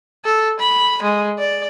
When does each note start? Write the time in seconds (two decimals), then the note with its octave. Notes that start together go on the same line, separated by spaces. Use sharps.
0.25 A4
0.59 B5
1.02 G#3
1.39 D5